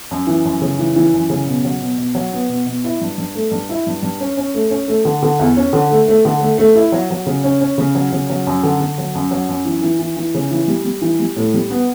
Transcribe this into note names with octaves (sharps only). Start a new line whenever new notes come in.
F#2
E3
F#2
C#3
E3
E3
F#2
C#3
B2
F#3
B2
B2
F#3
B3
B2
B2
E4
G2
G2
A3
G2
E4
G2
G2
C#4
C#4
A3
C#4
A3
D3
D3
E2
C#4
D3
A3
A3
D3
A3
A3
E4
F#3
F#3
C#3
C#4
C#4
C#3
F#3
C#3
F#3
F#2
D3
D3
F#3
F#2
F#3
F#2
E3
E3
E3
E3
C#3
E3
G3
G3
E3
G3
A2
G3
B3